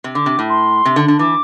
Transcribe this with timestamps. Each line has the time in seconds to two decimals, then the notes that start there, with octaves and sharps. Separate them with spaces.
0.04 C3
0.15 D3 D6
0.26 C3
0.39 A2
0.50 C6
0.85 C3
0.96 D3
1.08 D3
1.19 E3 D6